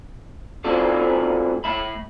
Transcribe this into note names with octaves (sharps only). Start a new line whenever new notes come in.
A3 C4 F4 F#4 A4 D5
A3 E5 B5